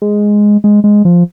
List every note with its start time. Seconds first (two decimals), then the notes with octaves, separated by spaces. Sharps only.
0.02 G#3
0.64 G#3
0.84 G#3
1.05 F3